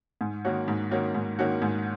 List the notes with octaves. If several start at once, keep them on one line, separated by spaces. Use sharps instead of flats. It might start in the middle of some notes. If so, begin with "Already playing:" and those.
G#2
D#3 A#3 C#4 F#4
G#2
D#3 A#3 C#4 F#4
G#2
D#3 A#3 C#4 F#4
G#2